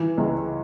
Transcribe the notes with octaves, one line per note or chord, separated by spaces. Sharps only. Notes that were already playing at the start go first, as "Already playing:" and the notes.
Already playing: E3
C#2